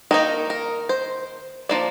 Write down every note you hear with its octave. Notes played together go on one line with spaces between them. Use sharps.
D#3 A#3 D#4 A#4
A#4
C5
F3 A#3 D4 D5